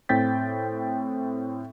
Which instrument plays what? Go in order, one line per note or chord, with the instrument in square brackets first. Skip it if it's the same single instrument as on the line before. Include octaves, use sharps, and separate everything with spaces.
[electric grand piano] A2 C4 G5 G6 A6 B6